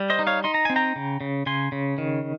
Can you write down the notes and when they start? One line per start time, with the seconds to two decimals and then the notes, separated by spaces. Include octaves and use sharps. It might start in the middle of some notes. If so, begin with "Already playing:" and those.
Already playing: G3
0.10 C5 D#5
0.19 D#4
0.27 C#5 F5
0.44 D#4 C6
0.54 A#5
0.65 C4 G#5
0.76 G5 A#5
0.96 C#3
1.21 C#3
1.46 C#3 G#5 C6
1.72 C#3
1.98 D#3